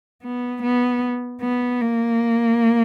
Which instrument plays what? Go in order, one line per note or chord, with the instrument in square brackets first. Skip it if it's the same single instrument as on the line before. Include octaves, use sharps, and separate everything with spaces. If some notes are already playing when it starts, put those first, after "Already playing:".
[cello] B3
B3
B3
A#3